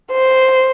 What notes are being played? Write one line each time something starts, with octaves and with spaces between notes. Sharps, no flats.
C5